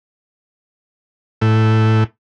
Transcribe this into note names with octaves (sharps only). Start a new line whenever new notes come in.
A2